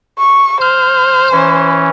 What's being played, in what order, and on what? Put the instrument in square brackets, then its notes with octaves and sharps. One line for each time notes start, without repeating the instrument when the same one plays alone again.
[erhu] C#6
[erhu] C5 [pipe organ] F6 G6
[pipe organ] E3 C#4